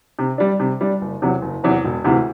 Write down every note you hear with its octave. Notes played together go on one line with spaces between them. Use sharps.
C3
G3 D4
C3
G3 D4
F#1
E2 C3 F#3
F#1
E2 C3 F#3
E1
D2 C3 E3